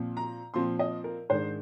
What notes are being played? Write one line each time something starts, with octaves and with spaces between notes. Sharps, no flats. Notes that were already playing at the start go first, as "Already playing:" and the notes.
Already playing: A#2 F3 C4
A#5
A#2 F3 C4 C6
D#5
A#4
G#2 D#3 G#3 D4 C5